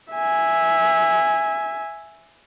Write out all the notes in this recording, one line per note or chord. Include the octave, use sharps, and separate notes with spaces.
E5 G#5